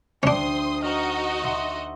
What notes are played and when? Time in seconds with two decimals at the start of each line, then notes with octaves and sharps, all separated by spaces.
0.23 D2 C#4 D4 C5 G5 C6 D#6
0.83 D#4 F#4 D#5 F6
1.44 E5 C6 E7